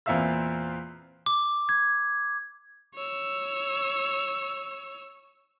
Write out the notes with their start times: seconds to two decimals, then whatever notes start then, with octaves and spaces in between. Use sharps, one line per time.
0.06 E2 A#2 C4 E5 F5 E6
1.26 D6
1.69 G#6
2.94 C#5 E6